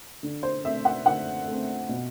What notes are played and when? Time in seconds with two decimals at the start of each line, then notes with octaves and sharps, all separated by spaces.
0.23 D3
0.43 C5
0.64 A3 C4 E5
0.85 F#5
1.06 D3 F#5
1.48 A3 C4
1.89 B2